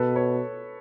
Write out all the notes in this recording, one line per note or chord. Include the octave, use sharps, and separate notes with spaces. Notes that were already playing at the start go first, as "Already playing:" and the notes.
Already playing: B2 A4 B4
B4 C#5